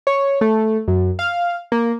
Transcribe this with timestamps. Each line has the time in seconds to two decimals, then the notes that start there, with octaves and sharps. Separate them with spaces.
0.07 C#5
0.41 A3
0.88 F#2
1.19 F5
1.72 A#3